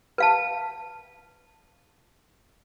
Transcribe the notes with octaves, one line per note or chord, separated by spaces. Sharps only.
B4 F5 A5